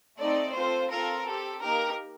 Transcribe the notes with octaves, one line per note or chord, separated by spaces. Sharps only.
A3 C4 D#4 D5
C4 F4 A4 C5
C4 F4 A4 A#4
C4 G4 A4
A#3 D#4 G4 A#4